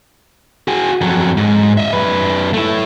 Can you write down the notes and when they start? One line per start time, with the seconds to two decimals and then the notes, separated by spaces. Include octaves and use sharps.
0.68 F#4 G#4
1.01 F2 F#3
1.37 G#2
1.77 D#5 E5
1.93 F#2 B4
2.54 A3 E4